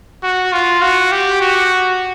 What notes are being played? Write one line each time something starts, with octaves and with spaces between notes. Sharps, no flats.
F#4
F4
F#4
G4
F#4